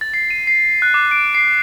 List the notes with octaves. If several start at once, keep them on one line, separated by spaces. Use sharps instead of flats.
A6
C7
D#7
C7
F#6
D6
D7
C7